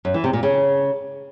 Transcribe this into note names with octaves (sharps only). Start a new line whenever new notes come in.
F#2
E3
C3
A#2
C#3